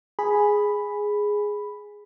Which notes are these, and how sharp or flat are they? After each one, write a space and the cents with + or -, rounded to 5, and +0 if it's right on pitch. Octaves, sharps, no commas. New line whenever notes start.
G#4 +0 B5 +0